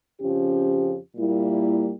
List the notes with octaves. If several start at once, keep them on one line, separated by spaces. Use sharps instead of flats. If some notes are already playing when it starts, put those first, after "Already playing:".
F2 C#3 F3 C#4 G4
A#2 G3 A#3 E4